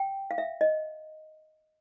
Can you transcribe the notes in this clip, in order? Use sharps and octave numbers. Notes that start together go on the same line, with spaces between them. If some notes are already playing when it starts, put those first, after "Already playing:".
Already playing: G5
F5
E5
D#5